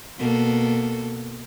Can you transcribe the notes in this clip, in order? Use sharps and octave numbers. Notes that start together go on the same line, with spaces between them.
B2 A#3 A4